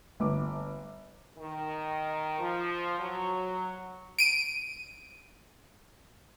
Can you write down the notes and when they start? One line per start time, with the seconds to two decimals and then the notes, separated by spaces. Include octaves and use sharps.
0.20 G1 D6
1.38 D#3
2.39 F3
2.99 F#3
4.19 D7 D#7